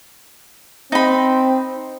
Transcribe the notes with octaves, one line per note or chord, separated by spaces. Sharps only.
C4 D#4 B5